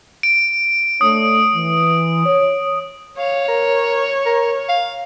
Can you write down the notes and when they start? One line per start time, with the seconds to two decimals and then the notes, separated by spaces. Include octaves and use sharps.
0.23 D7
1.01 A3 D4 C#5 D#6
1.55 E3
2.26 C#5
3.18 C#5 F5
3.48 A#4
4.26 A#4
4.69 F5